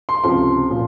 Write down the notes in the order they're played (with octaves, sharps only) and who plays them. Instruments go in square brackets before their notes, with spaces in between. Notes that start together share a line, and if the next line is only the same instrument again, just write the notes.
[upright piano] C6
C#2 C3 F3 C6
A#2 F3